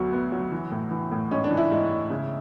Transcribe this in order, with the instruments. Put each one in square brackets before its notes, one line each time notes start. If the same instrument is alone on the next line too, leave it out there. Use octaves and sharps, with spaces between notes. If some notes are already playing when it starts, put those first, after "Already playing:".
Already playing: [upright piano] D2 F#3 B3 F#4
B3
F#3
E3
A2
E3
A2
G#2 C#4
D4
E3
E4
G#2
G#2
C#3